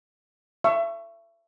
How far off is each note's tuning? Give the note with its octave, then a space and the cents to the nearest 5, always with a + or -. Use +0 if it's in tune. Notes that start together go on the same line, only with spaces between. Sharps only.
E5 +35 C#6 +0